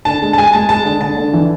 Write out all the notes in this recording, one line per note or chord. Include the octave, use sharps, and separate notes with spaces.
D3 A5
G#3
A5
G#3 G#5
G#3 A5
G#3 A5
D3
D3 A5
D3
E3